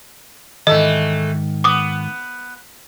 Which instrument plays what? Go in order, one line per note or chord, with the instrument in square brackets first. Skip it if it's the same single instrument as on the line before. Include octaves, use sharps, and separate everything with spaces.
[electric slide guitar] G#2 D#3 [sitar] E3 A3 A4 [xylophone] D#5
[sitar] B3 [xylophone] D6 D#6